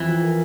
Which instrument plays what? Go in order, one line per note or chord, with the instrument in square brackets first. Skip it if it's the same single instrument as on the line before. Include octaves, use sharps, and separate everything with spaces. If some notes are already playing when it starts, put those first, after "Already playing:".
Already playing: [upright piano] F2 [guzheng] E3
[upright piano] F3
A#4